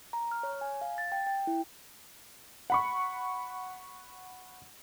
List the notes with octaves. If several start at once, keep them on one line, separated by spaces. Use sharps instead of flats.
A#5
F6
C#5
G#5
F5
A6
G5
G5
E4
F#5 B5 C#6